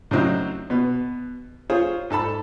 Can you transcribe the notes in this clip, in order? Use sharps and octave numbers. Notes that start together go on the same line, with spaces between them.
A2 C#3 F#3 C4 D4 D#4
B2 B3
F4 G#4 C5 C#5
G#2 A4 A5 B5